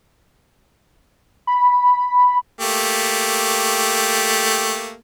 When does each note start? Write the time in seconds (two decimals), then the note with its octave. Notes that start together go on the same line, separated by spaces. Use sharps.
1.47 B5
2.60 A3 A#3 G4